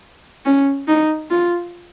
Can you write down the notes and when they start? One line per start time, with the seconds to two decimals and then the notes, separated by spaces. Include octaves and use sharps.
0.45 C#4
0.88 D#4
1.30 F4